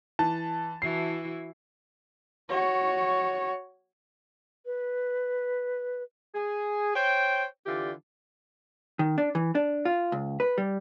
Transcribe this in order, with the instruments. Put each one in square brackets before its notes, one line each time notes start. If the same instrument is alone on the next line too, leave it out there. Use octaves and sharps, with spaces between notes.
[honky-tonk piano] E3 [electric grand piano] A5
[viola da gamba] E3 E4 F#4 [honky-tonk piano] C7
[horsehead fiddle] F#4 C#5
[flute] B4
[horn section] G#4
C5 C#5 G5
D3 E3 F4 G4 D5
[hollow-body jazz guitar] D#3
D4
E3
D4
F4
C#2
B4
G3